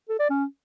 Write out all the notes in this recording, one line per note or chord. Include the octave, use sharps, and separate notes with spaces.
A4
D5
C#4